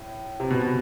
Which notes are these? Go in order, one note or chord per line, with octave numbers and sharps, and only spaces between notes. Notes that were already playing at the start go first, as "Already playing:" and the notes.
Already playing: A2
C3
B2
B2